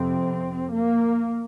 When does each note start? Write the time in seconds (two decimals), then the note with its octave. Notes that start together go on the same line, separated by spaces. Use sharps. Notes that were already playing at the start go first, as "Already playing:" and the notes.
Already playing: F2 C3 C4
0.74 A#3